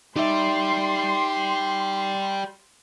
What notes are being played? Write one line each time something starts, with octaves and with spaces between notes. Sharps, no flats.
D#4 G4 D5 E5 C6